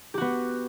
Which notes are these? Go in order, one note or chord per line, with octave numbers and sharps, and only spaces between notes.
B3 F#4 G4